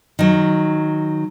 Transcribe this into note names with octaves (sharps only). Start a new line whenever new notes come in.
D#3 F#3